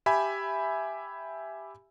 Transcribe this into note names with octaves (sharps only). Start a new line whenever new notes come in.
G4 E5 G#5 B5